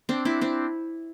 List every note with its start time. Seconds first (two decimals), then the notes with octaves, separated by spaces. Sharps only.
0.09 C4 D4
0.25 D4 E4
0.41 C4 D4